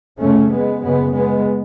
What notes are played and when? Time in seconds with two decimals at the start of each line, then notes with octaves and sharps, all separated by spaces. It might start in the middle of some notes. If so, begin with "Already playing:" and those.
0.19 F#2 C#3 A3 C#4
0.51 G#3 B3
0.82 F#2 C#3 G#3 B3
1.14 G#3 B3